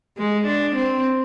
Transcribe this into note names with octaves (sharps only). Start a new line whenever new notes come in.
G#3
D4
C4